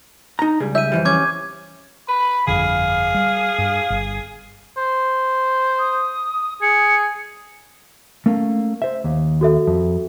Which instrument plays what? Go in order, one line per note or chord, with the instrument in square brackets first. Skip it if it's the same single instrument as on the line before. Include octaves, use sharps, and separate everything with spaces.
[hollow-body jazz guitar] D#4 A#5
C#2 G3 G#4
[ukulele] E5 [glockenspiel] G6 D#7
[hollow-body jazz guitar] F2 E3 G3
[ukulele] C#4 [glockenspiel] D6 G#6
[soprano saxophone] B4 [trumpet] B5
[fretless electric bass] G1 F2 D3 [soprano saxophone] G#4 [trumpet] F5
[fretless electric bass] G3
G2
G1
[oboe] C5
[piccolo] D#6
[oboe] G#4 [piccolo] C#7
[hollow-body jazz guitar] A3 A#3 C#4
C5 E5
D#2
[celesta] F#4 A4 E5
[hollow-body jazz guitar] F2